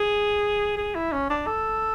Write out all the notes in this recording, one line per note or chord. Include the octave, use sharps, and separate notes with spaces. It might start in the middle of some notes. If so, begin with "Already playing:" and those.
Already playing: G#4
G#4
E4
C#4
D4
A4